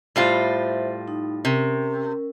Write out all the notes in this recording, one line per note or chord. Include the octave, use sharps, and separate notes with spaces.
A2 G3 F4 C5 E5
D#4
C3 C#4 A#4